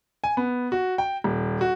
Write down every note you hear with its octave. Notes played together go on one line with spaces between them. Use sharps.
G#5
B3
F#4
G5
D#1
F#4